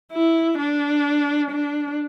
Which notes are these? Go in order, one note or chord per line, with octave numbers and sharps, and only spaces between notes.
E4
D4
D4